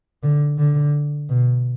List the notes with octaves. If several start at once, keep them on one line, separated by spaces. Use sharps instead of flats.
D3
D3
B2